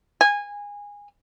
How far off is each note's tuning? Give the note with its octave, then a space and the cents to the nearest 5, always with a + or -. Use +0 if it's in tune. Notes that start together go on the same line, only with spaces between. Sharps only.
G#5 -20